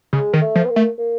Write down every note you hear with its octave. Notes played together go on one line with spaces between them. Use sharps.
C#3 G#3
D#3
A3
F3
B3
A#3
A3
A#3